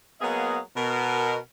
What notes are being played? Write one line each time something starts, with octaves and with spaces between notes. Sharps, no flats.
F#3 A#3 B3 G#4 D#5 F5
B2 A#4